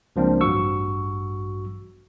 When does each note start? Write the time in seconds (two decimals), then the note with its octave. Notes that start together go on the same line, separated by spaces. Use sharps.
0.16 C#2 F3 A#3 C4 D4
0.41 A1 G2 F#4 C#6 E6